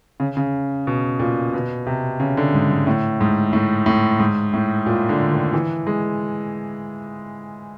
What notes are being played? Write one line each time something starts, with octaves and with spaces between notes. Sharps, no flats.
C#3
C#3
B2
A#2
B2
C3
C#3
D3
G#2
G#2
A2
G#2
A2
A2
G#2
A2
A#2
D3
D#3
E3
G#3